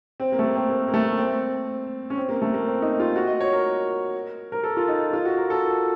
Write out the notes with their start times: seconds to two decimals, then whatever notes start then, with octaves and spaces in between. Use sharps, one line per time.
0.20 C4
0.32 A#3
0.39 A3
0.43 A#3
0.56 C4
0.69 A#3
0.88 A#3
0.94 A3
1.18 C4
2.10 C#4
2.17 C4
2.29 A#3
2.42 A3
2.54 A#3
2.66 C4
2.82 D#4
3.00 F4
3.16 F#4
3.27 D#5
3.41 C#5
3.53 A#4
4.52 A#4
4.64 A4
4.77 F4
4.88 D#4
5.13 F4
5.25 F#4
5.37 A#4
5.50 A4